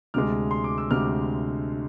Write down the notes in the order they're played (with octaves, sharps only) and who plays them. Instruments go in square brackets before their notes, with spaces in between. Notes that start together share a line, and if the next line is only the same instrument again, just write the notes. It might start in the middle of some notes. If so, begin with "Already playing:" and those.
[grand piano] D2 C3 G#3 D6 F6
C6
D6
E6
D2 C3 G#3 D6 F6